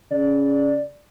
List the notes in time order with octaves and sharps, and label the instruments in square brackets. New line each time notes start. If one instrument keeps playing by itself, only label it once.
[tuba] C#3 [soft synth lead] D5